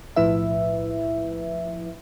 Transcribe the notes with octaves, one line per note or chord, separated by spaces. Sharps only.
B1 A2 F3 E4 B4 E5